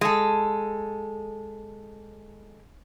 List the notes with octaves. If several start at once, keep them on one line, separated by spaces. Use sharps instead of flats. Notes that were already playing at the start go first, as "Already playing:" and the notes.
G#3 A4